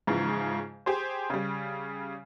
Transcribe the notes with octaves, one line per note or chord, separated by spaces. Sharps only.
G#2 C#3 E3 F3
G4 G#4 C5
C#3 G3